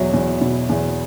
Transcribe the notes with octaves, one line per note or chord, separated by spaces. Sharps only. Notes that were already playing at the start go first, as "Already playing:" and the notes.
Already playing: E2 B2 F#3 E5
E2
B2
E2